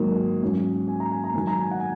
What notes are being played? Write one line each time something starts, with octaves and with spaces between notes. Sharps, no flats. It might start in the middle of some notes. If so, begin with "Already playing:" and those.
Already playing: G#2 D#3 F#3 A#3
G#2 F#3 C#4
G#5
A#5
G#5
A#5
G#2 D#3 F#3 G#5
A#5
G#5
F#5
G#5